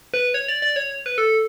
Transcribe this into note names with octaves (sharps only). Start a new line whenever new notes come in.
B4
C#5
D5
D5
C#5
B4
A4